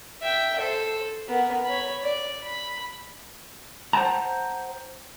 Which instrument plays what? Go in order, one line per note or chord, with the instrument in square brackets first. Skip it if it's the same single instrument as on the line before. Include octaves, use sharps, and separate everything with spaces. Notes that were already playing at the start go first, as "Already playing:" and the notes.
[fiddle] E5 G5
A4 C5
B3 A#4
C#5 B5
D5
B5
[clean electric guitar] C5 F#5 G5 A5 A#5